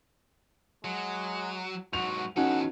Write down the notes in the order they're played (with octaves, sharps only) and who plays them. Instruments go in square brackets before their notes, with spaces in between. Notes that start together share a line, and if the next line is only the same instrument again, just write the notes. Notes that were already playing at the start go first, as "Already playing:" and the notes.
[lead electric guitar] F#3 [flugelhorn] G#3
[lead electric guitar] G#2 F#3 [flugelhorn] F#4 [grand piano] F7
[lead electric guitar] E2 A4 [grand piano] C#4 D#4 F#4 [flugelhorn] F#5